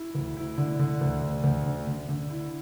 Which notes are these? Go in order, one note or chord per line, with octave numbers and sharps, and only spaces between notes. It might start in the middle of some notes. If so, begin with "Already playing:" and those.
Already playing: E4
D2
E4
D3
D3
D2
D3
D2
D3
D3
D3
E4